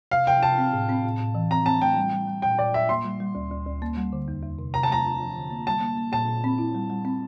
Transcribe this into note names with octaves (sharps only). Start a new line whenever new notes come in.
C3 F5
C3 G5
C3 A5
C4
A2
C4
A2
A2
E3
C4 A#5
C4 A5
A3 G5
G3
G3
G3
A#2 G5
A#2 D5
A#2 E5
A#3 C6
G3
G3
D2
D2
D2
A#3
G3
D3
E2
E2
C3
C3 A#5
A5
A3 A#5
A3
F3
D3
A#3
G3 A5
A#3
A#3
A#2 A5
A#2
C4
E4
G3
G3
C4